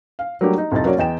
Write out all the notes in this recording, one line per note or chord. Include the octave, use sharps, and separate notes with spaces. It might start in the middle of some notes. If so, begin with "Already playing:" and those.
F5
F#3 G3 A3 A#3 D4 G4
D#4
C2 F2 F3 D#4 A6
F#3 A#3 C#4 F#4 C#5 D5
E2 D#5 G5 E7